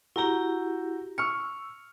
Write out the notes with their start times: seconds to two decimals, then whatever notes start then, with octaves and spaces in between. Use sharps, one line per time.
0.16 E4 F#4 G4 A#5 G7
1.18 C#6 E6 F6 C#7